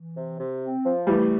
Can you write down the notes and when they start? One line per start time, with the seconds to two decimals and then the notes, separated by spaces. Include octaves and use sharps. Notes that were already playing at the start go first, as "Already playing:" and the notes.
Already playing: E3
0.16 C3
0.39 C3
0.62 C4
0.85 F3
1.07 E3 G3 A3